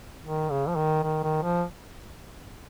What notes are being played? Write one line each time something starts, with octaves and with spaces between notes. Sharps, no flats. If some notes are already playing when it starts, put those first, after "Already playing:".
D#3
C#3
F3
D#3
D#3
D#3
F3